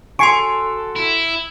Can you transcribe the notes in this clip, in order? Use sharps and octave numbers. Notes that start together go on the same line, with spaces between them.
F#4 A4 G#5 C6 C#6 C7 D7
E4